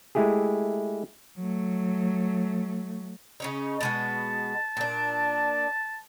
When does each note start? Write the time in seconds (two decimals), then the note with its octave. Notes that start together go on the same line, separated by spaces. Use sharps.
0.15 G#3 A3 E4 G4 G#4
1.38 F#3 A3
3.40 C#3 C#4 D#4
3.81 B2 G#3 B3 A5
4.77 A#2 D4